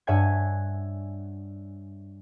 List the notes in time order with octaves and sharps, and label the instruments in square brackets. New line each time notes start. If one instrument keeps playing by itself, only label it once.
[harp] G2 C#5 E5 F#5 G#5 G#6